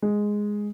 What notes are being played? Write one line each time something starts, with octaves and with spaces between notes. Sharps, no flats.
G#3